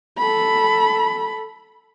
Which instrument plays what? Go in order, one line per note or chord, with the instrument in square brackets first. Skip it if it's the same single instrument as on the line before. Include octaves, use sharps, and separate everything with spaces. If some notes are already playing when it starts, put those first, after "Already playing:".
[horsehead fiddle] A4 B5